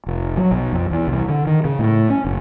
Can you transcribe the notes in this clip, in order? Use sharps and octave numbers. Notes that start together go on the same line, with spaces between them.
F1
F#3
B1
F2
E2
C2
D3
D#3
C#3
A2
C#4
F#1